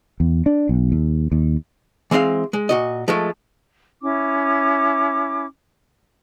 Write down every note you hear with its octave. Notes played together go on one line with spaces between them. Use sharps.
E2
D4
B1
D#2
D#2
E3 G#3 C4 D#5 F5
G#3
A#2 F#4 D#5
F3 G#3 A3
C#4 E4 D6